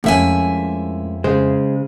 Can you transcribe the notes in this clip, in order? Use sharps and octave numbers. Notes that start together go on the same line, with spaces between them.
F2 A2 G#3 A#3 C#4 E5 G#5
C#3 G#3 C5